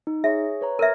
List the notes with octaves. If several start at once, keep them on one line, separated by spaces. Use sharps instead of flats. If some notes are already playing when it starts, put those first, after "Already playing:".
D#4
G#4 C#5 E5 A#6
B4 C#5 A#5
A#4 E5 A#5 F6 G#6